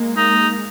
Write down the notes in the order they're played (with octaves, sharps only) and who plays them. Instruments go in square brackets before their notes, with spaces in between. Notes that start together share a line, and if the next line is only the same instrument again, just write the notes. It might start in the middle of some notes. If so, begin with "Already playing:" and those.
Already playing: [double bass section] G#3 A#3
[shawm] D#4